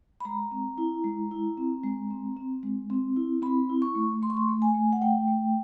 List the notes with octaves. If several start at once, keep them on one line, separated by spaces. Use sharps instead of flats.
B5
G#3 A#5
C4
E4
G#3
E4
C4
G#3
C4
C4
G#3
C4
E4
C4 B5
E4
C#6
A3
A3 C6
C#6
C6
A3
G#5
A3
F#5
A3 G5
A3